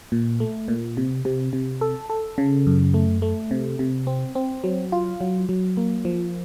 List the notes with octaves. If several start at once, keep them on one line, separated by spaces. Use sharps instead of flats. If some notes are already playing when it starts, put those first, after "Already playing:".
A#2
A3
A#2
C3
C3
C3
A4
A4
C#3
F#2
A3
A3
C3
C3
C4
C4
F#3
F4
F#3
F#3
A#3
F3